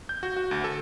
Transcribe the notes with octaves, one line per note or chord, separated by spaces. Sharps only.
G6
F#4
F#4
D2
A4